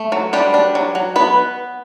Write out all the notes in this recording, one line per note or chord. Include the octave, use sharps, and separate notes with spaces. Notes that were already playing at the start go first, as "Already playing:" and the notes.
Already playing: A3
F#3
G3 D4 G4
D4
F#3
F#3
F#3 B3 B4